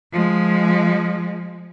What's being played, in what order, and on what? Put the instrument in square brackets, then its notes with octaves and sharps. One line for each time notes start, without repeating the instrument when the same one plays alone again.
[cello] F3 G#3